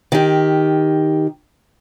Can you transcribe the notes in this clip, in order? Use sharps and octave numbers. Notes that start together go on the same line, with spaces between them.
D#3 G4